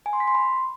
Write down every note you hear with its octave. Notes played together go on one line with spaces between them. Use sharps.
G#5
C6
B6
C6
B5